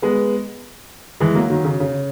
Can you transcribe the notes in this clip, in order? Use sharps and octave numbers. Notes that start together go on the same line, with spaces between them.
G#3 B3
E3 G#3
F#3 A#3
D#3 F#3
C#3
C#3